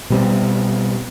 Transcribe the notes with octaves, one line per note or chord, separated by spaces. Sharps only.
B2 G3 C4